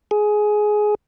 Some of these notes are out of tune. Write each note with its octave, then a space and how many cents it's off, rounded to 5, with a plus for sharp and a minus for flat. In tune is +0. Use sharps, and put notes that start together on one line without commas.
G#4 +15